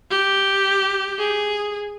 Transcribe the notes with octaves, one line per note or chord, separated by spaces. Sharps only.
G4
G#4